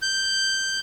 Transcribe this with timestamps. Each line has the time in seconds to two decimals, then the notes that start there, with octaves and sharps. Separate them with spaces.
0.02 G6